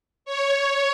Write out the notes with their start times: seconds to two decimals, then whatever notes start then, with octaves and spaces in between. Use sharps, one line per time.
0.25 C#5